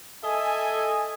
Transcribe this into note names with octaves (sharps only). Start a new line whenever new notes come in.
A4 D#5 E5 G#5